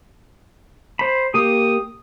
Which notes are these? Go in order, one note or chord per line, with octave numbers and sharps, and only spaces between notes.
C5 B5
A#3 G4 D#6